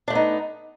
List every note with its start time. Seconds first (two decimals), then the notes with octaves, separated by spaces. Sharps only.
0.08 D4
0.10 A3
0.13 B3
0.15 D#4